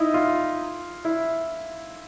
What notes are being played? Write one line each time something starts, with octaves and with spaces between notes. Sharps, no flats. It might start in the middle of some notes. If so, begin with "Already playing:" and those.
Already playing: D#4 E4
F4
E4